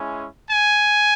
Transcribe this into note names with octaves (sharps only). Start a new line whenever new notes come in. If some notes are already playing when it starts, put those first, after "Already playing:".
Already playing: G#3 C#4 E4
G#5